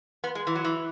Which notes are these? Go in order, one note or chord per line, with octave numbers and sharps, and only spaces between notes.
B3
G#3
E3
F#3
E3